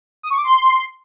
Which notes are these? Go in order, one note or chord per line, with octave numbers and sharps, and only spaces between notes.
D#6
C#6
D6
C6